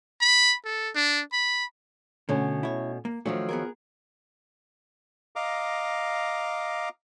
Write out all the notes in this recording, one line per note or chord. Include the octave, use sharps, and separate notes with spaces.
B5
A4
D4
B5
B2 D3 A3 C#4
E4 C#5
A#3
D#3 F3 F#3 A3 D4 C#5
B3 G#4 A#4
D#5 F5 A#5 D6